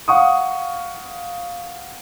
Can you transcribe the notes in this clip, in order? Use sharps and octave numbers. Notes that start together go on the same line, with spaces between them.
F5 F#5 C#6 D#6